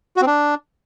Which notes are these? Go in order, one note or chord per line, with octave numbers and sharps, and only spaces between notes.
F#4
C4
D4